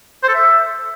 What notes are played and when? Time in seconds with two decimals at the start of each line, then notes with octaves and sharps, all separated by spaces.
0.23 C5
0.29 A4
0.34 E5